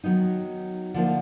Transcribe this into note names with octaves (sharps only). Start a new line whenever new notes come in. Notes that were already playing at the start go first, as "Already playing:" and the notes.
D#3 F#3 B3 D#4
D3 F3 A#3